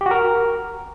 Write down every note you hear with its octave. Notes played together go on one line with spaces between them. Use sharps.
G4
F#4
A#4